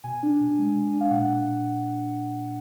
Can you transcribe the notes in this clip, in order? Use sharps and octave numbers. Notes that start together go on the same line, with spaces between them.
B2 G#5
D4
B2
G#3
B2
D4
F5
A#2 F#5
F#5